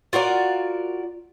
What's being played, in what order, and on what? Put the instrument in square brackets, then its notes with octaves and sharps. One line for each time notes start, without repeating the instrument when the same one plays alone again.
[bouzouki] F4 F#4 A#4 D5